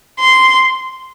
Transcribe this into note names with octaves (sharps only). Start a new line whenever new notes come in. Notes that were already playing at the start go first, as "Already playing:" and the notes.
C6